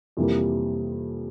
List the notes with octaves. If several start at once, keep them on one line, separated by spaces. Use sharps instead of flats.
F2 C3 E3 G3 A#3